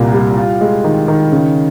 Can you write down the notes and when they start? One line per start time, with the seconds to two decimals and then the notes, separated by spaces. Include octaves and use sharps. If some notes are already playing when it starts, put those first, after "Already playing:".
Already playing: C2 A#2 G3
0.13 G3
0.37 F4
0.61 G#3
0.84 D#3
1.08 D#3
1.32 C#3